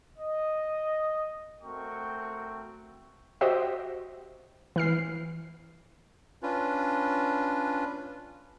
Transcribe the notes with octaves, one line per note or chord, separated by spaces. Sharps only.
D#5
A3 C4 F#4 A#4 G5 C#6
F#4 G4 C5 D#5 E5 G5
E3 F6 C7
C#4 D4 F4 B4